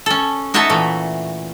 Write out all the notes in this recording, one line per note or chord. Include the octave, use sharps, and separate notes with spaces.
C#4 A4
D#4 F#4 C#5 D#5 E5 A5
A#2 E3 A3